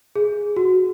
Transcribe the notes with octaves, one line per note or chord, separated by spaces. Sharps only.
G#4
F#4